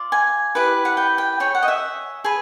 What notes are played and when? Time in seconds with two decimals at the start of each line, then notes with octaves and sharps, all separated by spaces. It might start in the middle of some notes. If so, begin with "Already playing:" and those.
Already playing: F4 D5
0.12 G#5
0.55 E4 G4 B4
0.85 F#5
0.97 G5
1.18 G5
1.40 G#4 C#5 G5
1.55 F#5
1.63 D#5
1.68 E5
2.24 G#4 B4